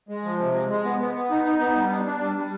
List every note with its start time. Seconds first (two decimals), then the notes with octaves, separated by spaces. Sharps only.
0.09 G#3
0.24 F3
0.38 C3
0.54 G#3
0.68 G#3
0.85 B3
0.99 B3
1.14 B3
1.30 D#4
1.44 D#4
1.59 B3
1.75 G3
1.90 D4
2.05 D4
2.20 G3
2.36 G3